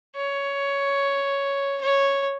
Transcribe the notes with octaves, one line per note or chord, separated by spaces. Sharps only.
C#5
C#5